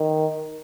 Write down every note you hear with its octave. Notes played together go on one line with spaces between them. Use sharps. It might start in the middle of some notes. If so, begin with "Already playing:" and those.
Already playing: D#3